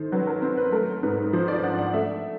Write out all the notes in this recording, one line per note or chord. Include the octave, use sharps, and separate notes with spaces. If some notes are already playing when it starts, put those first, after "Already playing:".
Already playing: D#3 A3 C5
F#3 B4
A#4
C4 B4
B4
A3 A#4
G#2 B4
F3 C5
D5
D4 F#5
F#5
A3 E5